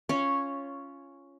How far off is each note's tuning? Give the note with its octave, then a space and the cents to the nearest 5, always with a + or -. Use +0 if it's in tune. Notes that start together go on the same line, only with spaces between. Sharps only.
C#4 +0 F4 -10 C#5 -5